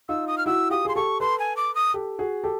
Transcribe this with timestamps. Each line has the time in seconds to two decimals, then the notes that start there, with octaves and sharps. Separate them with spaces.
0.09 D#4 F4 E6
0.27 D#6
0.38 F6
0.46 E4 F#4 E6
0.70 F4 G4 D#6
0.85 G#4 C6
0.96 G4 A4 C#6
1.20 A4 B4 C6
1.39 G#5
1.57 D6
1.75 D#6
1.94 G4 A4
2.19 F#4 G#4
2.44 G4 A4